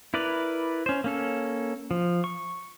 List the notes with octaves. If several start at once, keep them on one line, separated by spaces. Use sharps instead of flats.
E4 A#4 B4 D5
C#4 C5
A#3 C#4 A4
F3
C#6